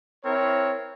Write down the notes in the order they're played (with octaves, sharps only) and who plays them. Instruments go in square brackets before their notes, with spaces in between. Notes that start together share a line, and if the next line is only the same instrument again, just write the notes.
[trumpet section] C4 E4 A#4 C#5